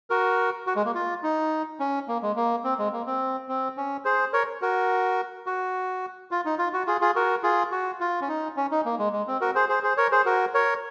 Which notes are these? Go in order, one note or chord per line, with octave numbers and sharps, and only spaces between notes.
F#4 A#4
F#4
G#3
A#3
F4
D#4
C#4
A#3
G#3
A#3
C4
G#3
A#3
C4
C4
C#4
G#4 C5
A#4 C#5
F#4 A#4
F#4
F4
D#4
F4
F#4
F4 G#4
F4 G#4
F#4 A#4
F4 G#4
F#4
F4
C#4
D#4
C#4
D#4
A#3
G#3
G#3
C4
F#4 A#4
G#4 C5
G#4 C5
G#4 C5
A#4 C#5
G#4 C5
F#4 A#4
A#4 C#5